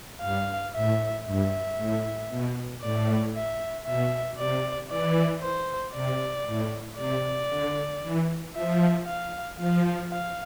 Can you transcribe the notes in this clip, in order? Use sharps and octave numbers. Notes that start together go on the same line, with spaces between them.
G2 F5
A2 E5
G2 E5
A2
B2
A2 D5
E5
B2 E5
C3 D5
E3 D5
C5
C3 D5
A2
C3 D5
D3
E3
F3 E5
F5
F3 F5
F5